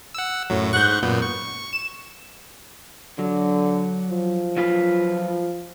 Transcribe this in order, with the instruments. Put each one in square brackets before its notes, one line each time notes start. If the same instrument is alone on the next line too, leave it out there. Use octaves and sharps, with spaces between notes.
[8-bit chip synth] F#5 E6
F#2 A2 F#3
[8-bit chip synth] G#2 F#5 C#6 [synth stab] F#6 G6
[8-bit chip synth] F#2 A#2 B3
C#6
[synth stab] E7
[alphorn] D3 [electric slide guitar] F#3
[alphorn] F3
[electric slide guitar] F#3 F4 B4